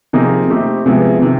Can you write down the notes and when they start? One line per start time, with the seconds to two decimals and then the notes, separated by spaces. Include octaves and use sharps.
0.13 C3 F3 A#3 D#4 G#4
0.50 A3 C4 D#4 G4
0.86 C3 F3 G#3 B3 E4
1.22 C3 D#3